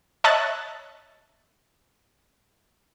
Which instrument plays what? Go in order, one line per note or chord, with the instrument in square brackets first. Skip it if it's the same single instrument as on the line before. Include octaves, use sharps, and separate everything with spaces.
[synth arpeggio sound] C#5 D#5 E5 A5 F#6 A6